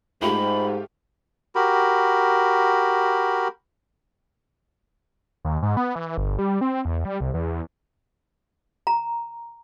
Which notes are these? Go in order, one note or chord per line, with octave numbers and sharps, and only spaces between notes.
G#2 A3 F4 G4 B5
F#4 G4 A#4 B5
D#2
G#2
B3
E3
G1
G3
C4
E2
G3
C2
E2
E2
A#5